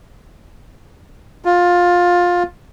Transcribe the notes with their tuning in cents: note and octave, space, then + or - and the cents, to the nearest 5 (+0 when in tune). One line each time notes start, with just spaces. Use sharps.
F4 +15